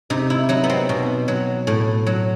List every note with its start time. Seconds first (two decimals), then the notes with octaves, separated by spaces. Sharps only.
0.10 C3 D#4
0.30 E4
0.49 F#3 D#4
0.64 B3
0.70 C4
0.89 B2
1.28 F#3
1.67 A2
2.06 F#3